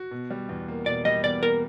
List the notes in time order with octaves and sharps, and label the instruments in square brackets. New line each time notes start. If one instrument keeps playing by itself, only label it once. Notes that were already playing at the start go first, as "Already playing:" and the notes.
Already playing: [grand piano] F#4
B2
G3
E2
A#3
[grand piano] B2 [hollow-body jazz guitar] D5
[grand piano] G3 [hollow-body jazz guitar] D#5
[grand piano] E2 [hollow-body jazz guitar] D5
[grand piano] A#3 [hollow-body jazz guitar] A#4